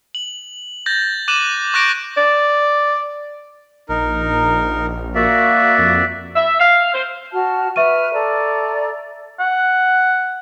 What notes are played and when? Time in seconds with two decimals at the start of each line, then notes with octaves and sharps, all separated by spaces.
0.15 F#7
0.86 G6 A6 A#6
1.28 D6 F#6 D#7 E7 F#7
1.74 C#6 D6 F#6 G6 A#6 D7
2.17 D5
3.89 A#1 D#4 A#4
5.15 A#3 F#4 D5 E5
5.78 F2
6.36 E5
6.59 F5
6.94 C5
7.32 F#4 A5 F6
7.76 B4 E5 C#6 F6 D#7
8.13 A4 D5 A#5
9.40 F#5